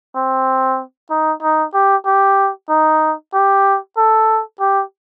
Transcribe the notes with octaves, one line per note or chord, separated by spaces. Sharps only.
C4
D#4
D#4
G4
G4
D#4
G4
A4
G4